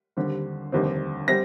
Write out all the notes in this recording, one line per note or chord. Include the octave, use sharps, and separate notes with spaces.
D#2 D3 G3 C4
F1 D#2 D3 G3 C4
G3 C4 A#6